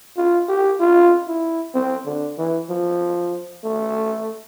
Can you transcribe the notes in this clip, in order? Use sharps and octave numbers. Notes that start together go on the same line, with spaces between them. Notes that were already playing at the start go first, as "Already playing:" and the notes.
F4
G4
F4
E4
C4
D3
E3
F3
A3